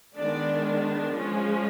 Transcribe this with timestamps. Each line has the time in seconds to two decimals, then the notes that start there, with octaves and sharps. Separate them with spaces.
0.15 D#3 G#3 B3 D4 D5
1.13 F3 G#3 C#4